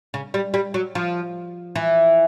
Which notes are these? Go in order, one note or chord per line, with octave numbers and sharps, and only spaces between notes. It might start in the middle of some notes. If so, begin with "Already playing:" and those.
C#3
G3
G3
F#3
F3
E3